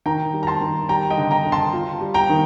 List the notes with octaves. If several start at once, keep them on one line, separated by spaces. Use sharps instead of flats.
D#3 G5 A#5
G3
A#5
A5 C6
D#3
G3 G5 A#5
D#5 G5
D3
G5 A#5
D3
A5 C6
F4
G3
G5 A#5
D#3